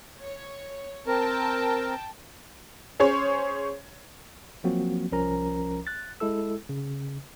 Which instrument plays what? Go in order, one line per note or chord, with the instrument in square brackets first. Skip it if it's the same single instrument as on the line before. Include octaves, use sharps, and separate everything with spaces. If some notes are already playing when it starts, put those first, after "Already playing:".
[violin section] C#5
[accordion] C4 A#4 [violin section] G5 A5
[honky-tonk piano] C#4 G#4 C5 C#5
[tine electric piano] F3 F#3 A#3 C4 F#4
C2 F3 C#4 A#4 A#5
F#6 A6
G#3 E4 A4 E6
C#3